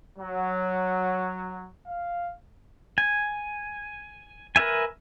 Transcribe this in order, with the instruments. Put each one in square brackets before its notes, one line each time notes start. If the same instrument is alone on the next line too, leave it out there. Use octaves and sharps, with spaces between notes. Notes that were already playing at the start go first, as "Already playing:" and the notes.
[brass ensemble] F#3
F5
[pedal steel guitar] G#5
A#4 B4 E5 G#5